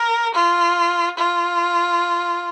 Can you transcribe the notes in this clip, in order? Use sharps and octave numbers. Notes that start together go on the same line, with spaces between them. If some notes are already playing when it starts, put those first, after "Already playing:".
Already playing: A#4
F4
F4